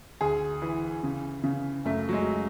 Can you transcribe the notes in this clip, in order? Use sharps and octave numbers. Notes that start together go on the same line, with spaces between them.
D2 G#4
E3
C#3
C#3
F#2 A3
F#3
G#3